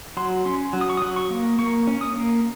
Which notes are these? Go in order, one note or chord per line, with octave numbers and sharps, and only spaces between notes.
F#3 C6
C#4 C6
F#3
D#6
C#6
D#6
F#3
C#6
A#3
A#3 C#6
C#4
D#6
A#3